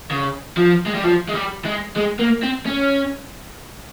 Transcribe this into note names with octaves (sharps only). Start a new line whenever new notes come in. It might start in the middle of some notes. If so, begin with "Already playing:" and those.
C#3
F3
G#3
G3
F3
G#3
G3
G#3
G#3
A#3
C4
C#4